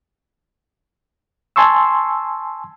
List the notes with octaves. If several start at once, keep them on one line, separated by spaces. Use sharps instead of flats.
G#5 A5 C6 C#6 E6